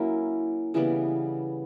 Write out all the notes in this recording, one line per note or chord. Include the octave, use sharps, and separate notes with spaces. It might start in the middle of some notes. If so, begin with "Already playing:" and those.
Already playing: F#3 A#3 C#4 E4
C#3 E3 G3 B3